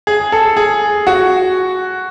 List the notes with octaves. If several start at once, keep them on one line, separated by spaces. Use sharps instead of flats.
G#4
A4
G#4
F#4